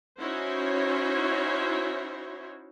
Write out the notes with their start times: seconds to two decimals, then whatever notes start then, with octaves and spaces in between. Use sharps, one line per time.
0.20 C#4 D#4 E4 F#4 C5 C#5